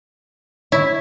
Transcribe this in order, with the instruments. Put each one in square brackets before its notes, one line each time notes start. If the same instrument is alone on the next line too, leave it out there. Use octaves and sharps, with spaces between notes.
[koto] E4 [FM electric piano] C#5 G#6 B6